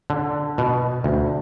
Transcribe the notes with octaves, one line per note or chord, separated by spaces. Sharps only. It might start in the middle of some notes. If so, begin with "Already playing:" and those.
D3
B2
D2